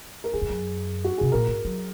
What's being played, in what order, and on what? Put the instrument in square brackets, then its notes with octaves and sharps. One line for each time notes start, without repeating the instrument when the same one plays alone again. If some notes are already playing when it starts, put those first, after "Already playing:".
[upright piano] A#4
[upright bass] F#2 [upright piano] G#4
[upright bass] F2
F#2
[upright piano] F#4
[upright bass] C3 [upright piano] G#4
[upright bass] A#2 [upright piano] A#4
[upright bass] G#2
F#3